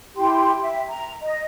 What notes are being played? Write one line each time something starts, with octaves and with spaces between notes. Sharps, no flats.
E4 G4 G5 C6
E5
A#5
D#5